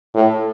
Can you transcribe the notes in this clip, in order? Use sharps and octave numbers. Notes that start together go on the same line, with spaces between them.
A2